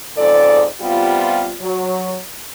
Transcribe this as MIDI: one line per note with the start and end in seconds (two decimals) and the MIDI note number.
0.17 0.65 41
0.17 0.65 44
0.17 0.65 49
0.17 0.65 69
0.17 0.65 74
0.81 1.53 48
0.81 1.53 55
0.81 1.53 59
0.81 1.53 65
1.61 2.18 54